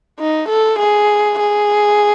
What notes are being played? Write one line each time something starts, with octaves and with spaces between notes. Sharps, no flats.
D#4
A4
G#4
G#4